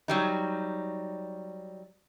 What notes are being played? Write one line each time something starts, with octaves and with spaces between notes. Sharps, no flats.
F#3 G3 D#4